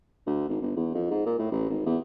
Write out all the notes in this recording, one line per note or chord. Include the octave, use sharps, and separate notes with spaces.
D2
G#1
G1
E2
F2
G#2
A#2
A2
A1
G#1
E2